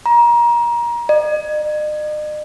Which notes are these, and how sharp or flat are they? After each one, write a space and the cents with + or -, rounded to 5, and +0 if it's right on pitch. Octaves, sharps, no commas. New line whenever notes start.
A#5 +25
D#5 -45